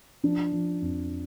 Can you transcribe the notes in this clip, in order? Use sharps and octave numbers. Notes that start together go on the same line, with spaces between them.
F3 D4
F3
F2